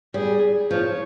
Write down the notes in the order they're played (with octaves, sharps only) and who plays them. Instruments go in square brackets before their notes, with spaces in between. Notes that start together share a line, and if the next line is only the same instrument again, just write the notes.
[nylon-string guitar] G3 [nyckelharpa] G#4
[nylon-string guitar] F3 [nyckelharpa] C#5